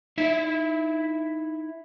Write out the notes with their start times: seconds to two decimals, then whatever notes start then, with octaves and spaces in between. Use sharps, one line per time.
0.18 D#4 E4 E5